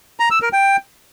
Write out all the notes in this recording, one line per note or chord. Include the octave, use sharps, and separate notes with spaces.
A#5
E6
A#4
G5